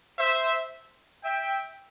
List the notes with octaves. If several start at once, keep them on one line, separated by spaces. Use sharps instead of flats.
C5 E5
E5 G5